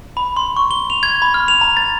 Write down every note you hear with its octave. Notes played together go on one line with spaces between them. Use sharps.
B5
C6
C#6
G7
F7
G#6
B5
F6
F7
A#5
A6